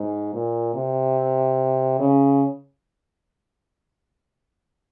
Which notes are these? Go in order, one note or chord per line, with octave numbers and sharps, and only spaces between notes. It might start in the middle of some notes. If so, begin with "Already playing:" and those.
Already playing: G#2
A#2
C3
C#3